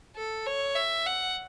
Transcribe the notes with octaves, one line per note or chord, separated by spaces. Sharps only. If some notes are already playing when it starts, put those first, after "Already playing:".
A4
C#5
E5
F#5